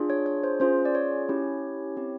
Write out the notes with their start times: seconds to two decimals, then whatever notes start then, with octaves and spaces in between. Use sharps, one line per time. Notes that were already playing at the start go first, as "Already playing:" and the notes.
Already playing: D4 F4 G#4
0.10 C#5
0.26 C#5
0.44 C5
0.60 C#4 F4 G#4 C5
0.85 D5
0.95 C#5
1.29 C#4 E4 G4
1.97 C4 E4 G4